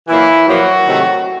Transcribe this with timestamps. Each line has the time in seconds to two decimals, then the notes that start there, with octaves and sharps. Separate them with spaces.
0.08 A#2 E3 F#3 A#3 E4
0.48 A#2 F3 F#3 A#3 F#4
0.87 C3 D#3 F#3 A3